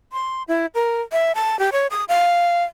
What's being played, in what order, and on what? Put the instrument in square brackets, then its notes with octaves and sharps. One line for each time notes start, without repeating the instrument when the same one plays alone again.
[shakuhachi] C6
E4
A#4
E5
A5
G4
C#5
D#6
F5